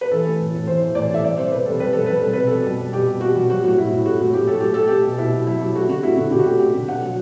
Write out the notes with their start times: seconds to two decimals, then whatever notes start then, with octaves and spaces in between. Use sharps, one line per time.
0.01 B4
0.11 E3 A4
0.26 A3
0.40 A2
0.54 A2
0.67 E3 C5
0.81 E3
0.95 A2 D5
1.10 A3 E5
1.24 G3 D5
1.37 C3 C5
1.52 C3 B4
1.66 G3 A4
1.80 G3 B4
1.93 G3 A4
2.06 G3 B4
2.20 C3 A4
2.33 B2 B4
2.47 G3 A4
2.65 B2
2.79 G3
2.93 B2 G4
3.07 B2
3.21 B2 F#4
3.35 G3
3.50 F#3 F#4
3.64 A2 F#4
3.78 A2 E4
3.92 A2
4.06 A3 F#4
4.20 A2
4.34 A2 G4
4.47 F#3 A4
4.60 A3 G4
4.74 A3 A4
4.88 A3 G4
5.04 B2
5.18 B2 E4
5.33 F#3
5.47 F#3 E4
5.61 F#3
5.75 A3 F#4
5.89 D3 F#4
6.03 A3 E4
6.17 D3 F#4
6.32 D3 G4
6.39 F#4
6.46 A3 G4
6.59 A3 G4
6.74 D3
6.88 B2 F#5
7.02 F#3